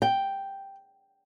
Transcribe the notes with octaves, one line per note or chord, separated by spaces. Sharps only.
G5